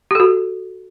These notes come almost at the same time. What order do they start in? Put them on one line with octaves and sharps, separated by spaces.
G4 A4 F#4